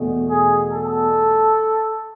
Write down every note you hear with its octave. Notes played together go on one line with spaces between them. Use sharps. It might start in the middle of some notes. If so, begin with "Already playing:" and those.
Already playing: E2 B2 A3
G#4
A4